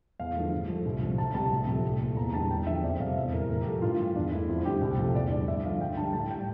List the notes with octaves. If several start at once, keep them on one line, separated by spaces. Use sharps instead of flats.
E2 F5
D3 F3 A3
G2
F3 A3
C2
C3 F3
D2 A5
C3 G3 A5
D2
C3 F3 A3
C2
A#2 A3
E2 A#5
D3 G3 A5
E2 G5
D3 F3 E5
F2 D5
C3 G3 F5
E2 E5
C3 E3 A#4
A2 A#4
G4
F3 A3 A4
G2 F4
E3 G3
E2 D4
E3 A3 E4
F2 F4
D3 G3 G4
C2
C3 F3 A3
E2 D5
D3 G3 D5
G2 E5
D3 F3 A3 F5
D2 G5
D3 G3 A5
A2 A5
G3 G5